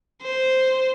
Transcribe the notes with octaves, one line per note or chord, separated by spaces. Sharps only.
C5